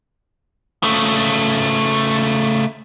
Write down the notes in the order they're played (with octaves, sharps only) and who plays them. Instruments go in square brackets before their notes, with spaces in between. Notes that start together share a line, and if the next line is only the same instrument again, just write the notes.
[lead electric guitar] C#3 A3